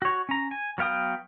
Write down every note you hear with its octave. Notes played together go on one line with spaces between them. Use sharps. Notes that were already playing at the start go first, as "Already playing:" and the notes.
F#4 C#5
C#4 A#5
G#5
F#3 B3 F5 G5 D#6